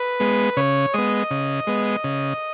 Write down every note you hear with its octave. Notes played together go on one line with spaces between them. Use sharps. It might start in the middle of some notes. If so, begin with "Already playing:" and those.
Already playing: B4
G#3 B3
C#3 C#5
G#3 B3 D#5
C#3
G#3 B3
C#3